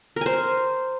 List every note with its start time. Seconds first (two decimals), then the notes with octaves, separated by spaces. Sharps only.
0.16 A#4
0.21 G#5
0.26 C5